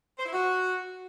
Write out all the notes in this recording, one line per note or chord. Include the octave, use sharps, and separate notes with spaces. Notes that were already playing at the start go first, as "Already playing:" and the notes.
C5
E4
F#4